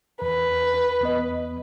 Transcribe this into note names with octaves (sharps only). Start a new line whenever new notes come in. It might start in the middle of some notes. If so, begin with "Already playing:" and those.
E2 B4
E2 B3 D#5